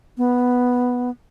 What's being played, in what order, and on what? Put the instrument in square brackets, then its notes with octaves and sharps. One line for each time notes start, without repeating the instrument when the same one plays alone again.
[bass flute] B3